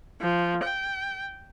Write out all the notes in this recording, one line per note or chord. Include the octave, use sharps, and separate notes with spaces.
F3
G5